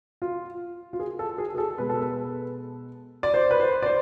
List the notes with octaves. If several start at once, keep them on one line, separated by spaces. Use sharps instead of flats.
F4
F4
G#4
A4
G#4
G#4
A4
B2 G#3 B4
A4
B4
D5
C5
B4
C5
D5
C5